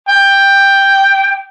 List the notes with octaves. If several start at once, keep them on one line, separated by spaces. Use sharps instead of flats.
G5